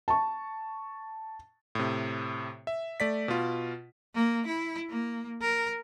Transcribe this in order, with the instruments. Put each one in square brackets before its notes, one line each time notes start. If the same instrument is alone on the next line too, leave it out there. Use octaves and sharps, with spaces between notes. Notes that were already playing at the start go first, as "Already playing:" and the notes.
[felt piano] A5 C#6
[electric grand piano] A2 C3
E5
A3 D5 B6
B2 F4
[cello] A#3
E4
A#3
A#4